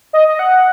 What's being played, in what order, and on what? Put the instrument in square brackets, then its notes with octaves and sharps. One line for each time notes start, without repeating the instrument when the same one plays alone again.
[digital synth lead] D#5
D#5
F#5